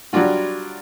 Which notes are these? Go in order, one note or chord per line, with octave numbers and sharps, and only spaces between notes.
F#3 G3 D4 F4 F#4